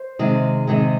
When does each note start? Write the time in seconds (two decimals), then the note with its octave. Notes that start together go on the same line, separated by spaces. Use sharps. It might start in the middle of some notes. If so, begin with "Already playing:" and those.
Already playing: C5
0.19 C3 D#3 G#3
0.67 C3 D#3 G#3